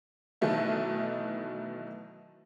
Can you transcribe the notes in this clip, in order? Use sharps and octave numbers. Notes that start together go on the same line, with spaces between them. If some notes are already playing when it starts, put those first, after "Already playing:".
B2 D#3 E3 F#3 A3 E4